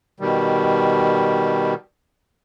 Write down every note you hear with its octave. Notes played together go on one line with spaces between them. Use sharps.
B2 D#3 G3